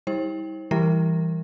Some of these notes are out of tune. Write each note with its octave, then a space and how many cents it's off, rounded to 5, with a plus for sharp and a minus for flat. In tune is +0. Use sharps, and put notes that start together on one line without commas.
G3 +10 E4 -45 C5 +35
E3 +0 G3 +0 A#4 -10